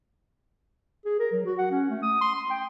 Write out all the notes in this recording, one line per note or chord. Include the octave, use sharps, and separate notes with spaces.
G#4
A#4
F#3
F#4
F#5
C#4
A3
D#6
C6
C6
G5